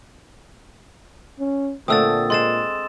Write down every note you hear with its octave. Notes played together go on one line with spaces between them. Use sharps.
C#4
A#2 D3 A3 C4 D#6 E6 A6
G#3 C5 C6 A6 E7